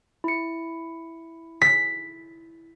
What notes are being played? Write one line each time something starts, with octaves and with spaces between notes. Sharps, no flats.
E4 C#7
B6